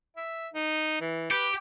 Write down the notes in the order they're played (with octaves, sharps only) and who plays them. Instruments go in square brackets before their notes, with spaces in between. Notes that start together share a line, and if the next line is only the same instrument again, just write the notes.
[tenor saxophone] E5
D#4
E3
[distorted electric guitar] G4 [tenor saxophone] B4